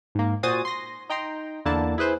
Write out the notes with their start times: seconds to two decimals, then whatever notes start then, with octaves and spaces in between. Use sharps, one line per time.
0.15 G#2 A#3
0.43 A#2 F#4 C5 G#5 D#6 A6
0.65 C6 A#6
1.10 D#4 G5 A#5 C6
1.65 E2 D3 A#3 E4 A5
1.98 E4 G#4 B4 C5